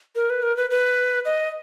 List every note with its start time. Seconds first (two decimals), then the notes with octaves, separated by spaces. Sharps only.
0.15 A#4
0.30 B4
0.43 A#4
0.57 B4
0.70 B4
1.25 D#5